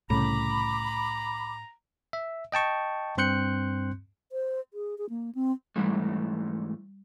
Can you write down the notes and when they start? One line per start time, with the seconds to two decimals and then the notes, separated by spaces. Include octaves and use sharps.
0.10 C2 A2 C#3 A#5 B5 D6
2.13 E5
2.52 D#5 G5 A5 C#6
3.17 G2 C4 C6 F#6 G6 C#7
4.32 C5
4.74 G#4
4.98 G#4
5.10 A#3
5.35 C4
5.76 G#2 E3 G3 A3